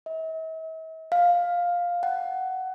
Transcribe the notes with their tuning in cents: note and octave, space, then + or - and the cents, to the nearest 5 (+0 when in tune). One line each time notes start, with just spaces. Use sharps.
E5 -45
F5 +10
F#5 +15